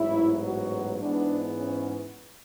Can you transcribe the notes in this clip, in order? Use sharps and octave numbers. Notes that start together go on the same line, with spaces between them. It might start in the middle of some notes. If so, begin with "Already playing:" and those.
Already playing: A1 G#2 F#3 B3 E4
F#4
G#2 E3 B3 D4
C#4